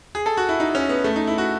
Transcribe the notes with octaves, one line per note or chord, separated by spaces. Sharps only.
G#4
A4
F#4
E4
D#4
C#4
B3
A3
D#4
E4
F#4